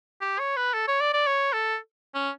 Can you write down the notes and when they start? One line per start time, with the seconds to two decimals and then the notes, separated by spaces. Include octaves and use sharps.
0.21 G4
0.39 C#5
0.57 B4
0.74 A4
0.88 C#5
1.01 D5
1.13 D5
1.27 C#5
1.53 A4
2.14 C#4